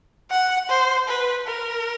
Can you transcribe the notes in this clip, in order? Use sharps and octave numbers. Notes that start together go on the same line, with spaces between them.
F#5
C5
B4
A#4